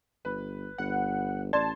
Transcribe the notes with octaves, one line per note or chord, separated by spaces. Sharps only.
G1 B4
G1 F#5
A1 D5 A5 C6